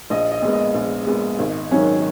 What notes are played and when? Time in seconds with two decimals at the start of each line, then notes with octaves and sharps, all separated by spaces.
0.10 A#1 D#5
0.32 D#5
0.42 A#2 G#3 B3
0.53 D#5
0.75 A#1
1.07 A#2 G#3 B3
1.39 G#1
1.71 G#2 D#3 F#3 C#4